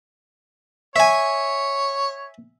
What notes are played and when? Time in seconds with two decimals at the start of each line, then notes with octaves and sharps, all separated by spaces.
0.96 C#5 E5 G#5